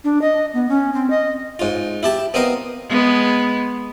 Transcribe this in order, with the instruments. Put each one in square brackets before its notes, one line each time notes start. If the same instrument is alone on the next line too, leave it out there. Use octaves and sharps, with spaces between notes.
[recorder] D4
D#5
B3
C#4
C4
D#5
[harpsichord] G#2 F4
E4 G4 A5
B3 C4 A#4 D#5 F5
[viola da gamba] G#3 B3